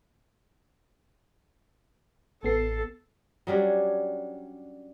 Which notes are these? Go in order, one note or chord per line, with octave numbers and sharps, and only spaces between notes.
A1 B3 A4 C7
F#3 G3 C#4 D4